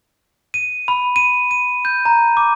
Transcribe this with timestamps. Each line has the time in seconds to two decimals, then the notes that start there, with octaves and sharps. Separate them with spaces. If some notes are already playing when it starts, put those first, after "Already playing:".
0.54 D#7
0.88 B5
1.16 D#7
1.51 D#7
1.85 G6
2.05 A#5
2.37 D6